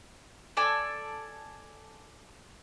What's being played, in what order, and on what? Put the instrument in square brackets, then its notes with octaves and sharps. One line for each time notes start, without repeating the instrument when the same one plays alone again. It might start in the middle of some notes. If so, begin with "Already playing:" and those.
[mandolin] A4 D5 G#5